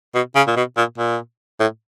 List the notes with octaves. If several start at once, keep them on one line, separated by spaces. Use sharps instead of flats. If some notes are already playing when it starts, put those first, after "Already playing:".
B2
C#3
A#2
B2
A#2
A#2
A2